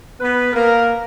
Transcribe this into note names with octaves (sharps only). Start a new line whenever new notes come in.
B3 B4
A#3 A#4